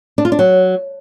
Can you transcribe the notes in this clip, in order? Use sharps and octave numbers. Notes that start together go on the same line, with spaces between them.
D4
F4
D4
F#3